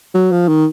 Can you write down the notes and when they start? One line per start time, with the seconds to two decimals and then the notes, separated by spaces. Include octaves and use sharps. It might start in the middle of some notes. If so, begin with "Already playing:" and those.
0.14 F#3
0.31 F3
0.48 D#3